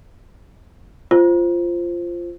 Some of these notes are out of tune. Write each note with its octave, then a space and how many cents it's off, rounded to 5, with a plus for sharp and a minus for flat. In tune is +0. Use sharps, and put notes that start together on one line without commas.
F4 -15 C5 +0